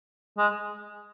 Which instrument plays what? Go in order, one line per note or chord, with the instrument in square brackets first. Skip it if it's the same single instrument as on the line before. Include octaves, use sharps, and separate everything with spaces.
[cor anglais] G#3